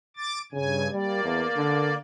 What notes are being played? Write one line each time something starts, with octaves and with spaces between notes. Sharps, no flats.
D6 A6
G2 C#3 G#5
G3 A#3 D5
E2
D3